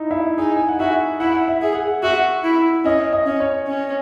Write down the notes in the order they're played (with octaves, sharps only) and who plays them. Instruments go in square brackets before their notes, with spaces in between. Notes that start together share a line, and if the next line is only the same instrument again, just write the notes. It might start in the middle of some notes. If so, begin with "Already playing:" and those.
Already playing: [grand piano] D#4 E4
E4
[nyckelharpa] D#4 [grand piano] G#4
[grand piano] G#5
F#5
[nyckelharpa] F#4 [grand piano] E5
[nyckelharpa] E4 [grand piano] F#5
[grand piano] E5
[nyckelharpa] G#4
[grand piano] F#5
[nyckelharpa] F#4 [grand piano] E5
[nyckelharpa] E4
[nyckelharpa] C#4 [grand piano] D#5
[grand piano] D#5
[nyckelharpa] C#4
[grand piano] C#5
[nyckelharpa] C#4